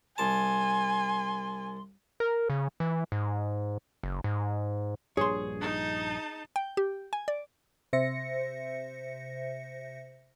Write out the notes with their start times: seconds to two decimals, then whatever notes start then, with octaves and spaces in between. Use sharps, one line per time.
0.18 C2 G#5 A5 C6
2.20 A#4
2.50 C#3
2.80 E3
3.12 G#2
4.03 F#1
4.24 G#2
5.17 A#1 G2 G#4 C#5 C6
5.61 D#4 A5
6.56 G5
6.77 G4
7.13 G#5
7.28 D5
7.93 C3 C5 E5 A#6 C#7